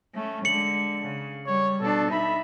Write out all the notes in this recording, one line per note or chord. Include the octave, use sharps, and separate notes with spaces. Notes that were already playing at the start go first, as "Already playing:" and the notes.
A3 C#4
D3 G#3 C#7 F#7
C#3
G3 C#5
B2 D4 A4
D#4 E5 B5